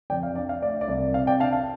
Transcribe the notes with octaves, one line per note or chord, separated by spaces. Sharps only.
F2 D5 G5
F5
D4 D5
F5
A3 D5
D5
C2
C3 F5
D5 G5
D4 F5 A5
F5 A5